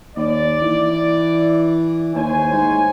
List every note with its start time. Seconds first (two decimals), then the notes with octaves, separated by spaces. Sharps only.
0.16 D#2 D5
0.62 E3
2.15 D#2 C5 C#5 G#5
2.53 G#2